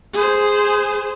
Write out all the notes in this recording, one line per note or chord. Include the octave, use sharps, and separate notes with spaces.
G#4 C5